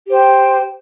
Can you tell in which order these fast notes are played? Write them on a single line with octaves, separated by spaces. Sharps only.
G4 C5 G5